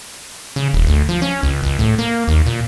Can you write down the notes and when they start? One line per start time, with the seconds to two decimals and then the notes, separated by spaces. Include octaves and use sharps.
0.56 C#3
0.73 D#1
0.87 D2
1.09 F3
1.22 C#4
1.43 C#2
1.63 C#2
1.79 A2
1.99 A#3
2.28 D#2
2.46 A#2